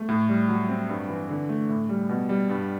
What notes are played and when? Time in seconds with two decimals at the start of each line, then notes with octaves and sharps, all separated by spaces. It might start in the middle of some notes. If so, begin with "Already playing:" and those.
Already playing: A3
0.09 A2
0.29 G3
0.49 F#3
0.69 C4
0.89 G2
1.09 E3
1.29 D3
1.49 A3
1.69 A2
1.89 G3
2.09 B2
2.29 G3
2.49 G2